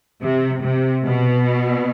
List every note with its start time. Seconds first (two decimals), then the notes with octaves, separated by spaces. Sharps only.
0.23 C3
0.63 C3
1.04 B2